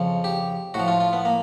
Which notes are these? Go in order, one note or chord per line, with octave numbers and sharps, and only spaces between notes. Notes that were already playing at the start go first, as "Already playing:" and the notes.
Already playing: F2 C#3 F3
G4
A2 F#4
F3
F4
F4
B3
A#3